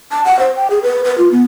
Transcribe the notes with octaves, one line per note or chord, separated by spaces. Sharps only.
A5
F#5
C5
G5
G#4
B4
B4
F4
B3